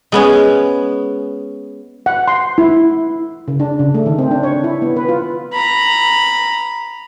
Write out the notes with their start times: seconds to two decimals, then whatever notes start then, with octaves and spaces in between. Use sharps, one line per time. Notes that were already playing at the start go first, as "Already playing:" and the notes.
0.12 G#3 B3 C#4
2.06 F#5
2.28 C6
2.58 E4
3.48 C#3
3.60 D4
3.79 C#3
3.94 A3
4.06 D#3
4.19 C4
4.31 D4
4.43 C#5
4.64 E4
4.82 B3
4.96 B4
5.09 F4
5.53 A#5 B5